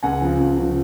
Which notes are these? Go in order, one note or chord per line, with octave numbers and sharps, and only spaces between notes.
C#2 F#5 G#5
C#3 F3
C#2
C#3 F3